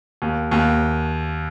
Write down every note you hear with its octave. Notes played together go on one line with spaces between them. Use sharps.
D#2
D#2